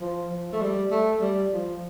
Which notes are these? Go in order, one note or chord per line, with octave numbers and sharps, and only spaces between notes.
F3
F3
A3
G3
A3
G3
F3